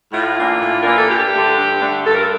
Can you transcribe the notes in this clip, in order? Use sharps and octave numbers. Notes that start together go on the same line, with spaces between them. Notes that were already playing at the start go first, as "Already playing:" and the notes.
A2 F4
E3 A#3 D4
A2
E3 A#3 D4 A#4
A4
G2 G4
D3 A3 D4
G2
D3 A3 D4
G2 A4
A#4
A4